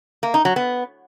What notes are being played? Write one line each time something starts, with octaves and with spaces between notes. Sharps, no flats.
A#3
D#4
F#3
B3